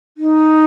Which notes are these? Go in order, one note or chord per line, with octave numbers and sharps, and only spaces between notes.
D#4